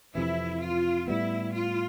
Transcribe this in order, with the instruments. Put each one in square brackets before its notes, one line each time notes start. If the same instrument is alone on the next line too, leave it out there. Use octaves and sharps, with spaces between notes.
[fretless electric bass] F2 C3 E3 [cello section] E4
[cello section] F4
[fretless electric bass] A2 G3 B3 [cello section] E4
[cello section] F4